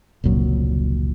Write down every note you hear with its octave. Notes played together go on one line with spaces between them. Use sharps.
F1 C#2 A#2 F#3